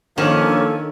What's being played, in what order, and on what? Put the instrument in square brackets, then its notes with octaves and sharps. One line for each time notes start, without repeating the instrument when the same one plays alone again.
[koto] D#3 [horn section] F3 A#3 C#4 [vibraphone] D4 [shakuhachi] A4